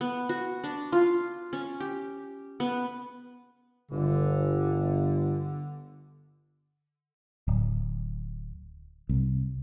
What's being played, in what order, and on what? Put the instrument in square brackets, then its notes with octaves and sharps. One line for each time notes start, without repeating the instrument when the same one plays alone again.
[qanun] B3
F#4
D4
F4
C#4
G4
B3
[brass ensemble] G1 [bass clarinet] D3
[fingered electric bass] D1
C2